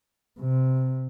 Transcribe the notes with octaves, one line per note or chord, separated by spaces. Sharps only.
C3